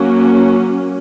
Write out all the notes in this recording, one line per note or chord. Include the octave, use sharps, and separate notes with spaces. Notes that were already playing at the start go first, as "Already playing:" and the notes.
Already playing: F#3 A#3 C#4